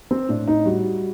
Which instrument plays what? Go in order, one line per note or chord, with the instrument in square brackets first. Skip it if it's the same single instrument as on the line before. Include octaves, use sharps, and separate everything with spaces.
[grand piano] C4
A2 D4
D#4
G3 F#4